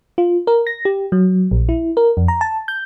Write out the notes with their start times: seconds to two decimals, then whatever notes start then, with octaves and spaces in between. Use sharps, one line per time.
0.18 F4
0.47 A#4
0.67 A#6
0.85 G4
1.12 F#3
1.51 A#1
1.69 E4
1.97 A#4
2.17 F2
2.28 A#5
2.41 A5
2.68 G6